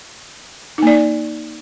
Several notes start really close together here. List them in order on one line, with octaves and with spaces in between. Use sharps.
D#4 A#3 D5